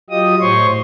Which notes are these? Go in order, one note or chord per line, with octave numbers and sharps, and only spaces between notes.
F#3 F4 G4 D#5 D#6
A2 C5 C#5 C6 C#6